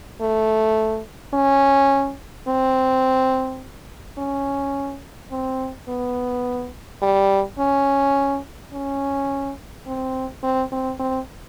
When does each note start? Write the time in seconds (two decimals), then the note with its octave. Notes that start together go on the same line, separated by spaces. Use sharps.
0.21 A3
1.34 C#4
2.48 C4
4.18 C#4
5.31 C4
5.89 B3
7.02 G3
7.59 C#4
8.73 C#4
9.87 C4
10.43 C4
10.72 C4
11.00 C4